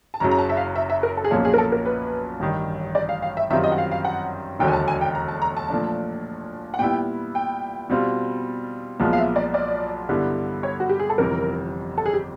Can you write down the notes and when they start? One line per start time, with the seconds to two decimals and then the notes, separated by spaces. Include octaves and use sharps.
0.14 A5
0.20 F#1 F#2 C#3 F#3 A#5
0.31 A#5
0.38 A5
0.49 E5
0.57 F5
0.76 E5
0.90 E5
1.03 A#4
1.17 A4
1.24 G#4
1.31 B1 A#2 F3 A#3 C#4 A4
1.45 G#4
1.54 A#4
1.58 A4
1.72 A#4
1.86 B4
2.40 A1 G2 D#3
2.95 D5
3.09 F5
3.22 F5
3.37 E5
3.50 F#2 D#3 G3 C4 F4 E5
3.64 D#5
3.72 F#5
3.78 F5
3.92 F5
4.05 F#5
4.59 E1 D#2 D3 F#3 G5
4.68 G#5
4.73 A5
4.88 G#5
5.01 G5
5.15 A#5
5.28 A5
5.42 A#5
5.57 A5
5.70 A#2 F3 A3 D4
6.74 F#5
6.79 A#2 G3 B3 E4 G5
7.35 G5
7.89 B2 G3 C4 F4
9.00 B1 A#2 F3 G#3 B3
9.13 F5
9.18 E5
9.36 D5
9.54 D5
10.09 G2 D3 G3 B3 E4
10.63 C#5
10.80 F#4
10.89 G4
10.99 G#4
11.10 A4
11.18 G1 F2 C3 E3 A#4
11.98 A4
12.06 G#4
12.14 G4